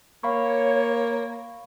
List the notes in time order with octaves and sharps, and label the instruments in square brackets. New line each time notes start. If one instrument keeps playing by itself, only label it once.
[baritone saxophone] A#3 [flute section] C#5 [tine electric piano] F5 B5 C#6